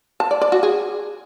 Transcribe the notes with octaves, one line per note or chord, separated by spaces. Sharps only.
A5
D5
D5
F#4
G#4